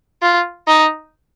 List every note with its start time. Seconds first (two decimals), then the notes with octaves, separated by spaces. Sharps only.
0.22 F4
0.68 D#4